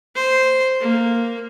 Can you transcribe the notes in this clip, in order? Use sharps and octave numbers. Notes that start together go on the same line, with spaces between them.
C5
A#3